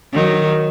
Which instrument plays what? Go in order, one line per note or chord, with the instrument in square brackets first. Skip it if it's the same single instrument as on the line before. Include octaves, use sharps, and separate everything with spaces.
[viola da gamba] D#3 F#3